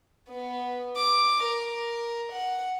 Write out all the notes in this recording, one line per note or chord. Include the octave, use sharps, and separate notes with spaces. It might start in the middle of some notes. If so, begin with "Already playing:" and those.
B3
D6
A#4
F#5